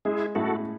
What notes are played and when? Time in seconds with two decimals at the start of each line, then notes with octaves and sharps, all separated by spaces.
0.05 G#3 E4 G#4
0.35 A2 F#4 A4